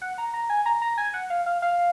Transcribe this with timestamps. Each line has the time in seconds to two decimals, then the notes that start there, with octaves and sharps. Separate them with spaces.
0.02 F#5
0.18 A#5
0.34 A#5
0.50 G#5
0.66 A#5
0.82 A#5
0.98 G#5
1.14 F#5
1.30 F5
1.46 F5
1.62 F5